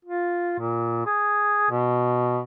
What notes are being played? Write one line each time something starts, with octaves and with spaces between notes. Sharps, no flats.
F4
A#2
G#4
B2